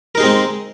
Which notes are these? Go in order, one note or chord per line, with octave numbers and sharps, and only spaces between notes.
G#3 C4 D#4 G#4 A#4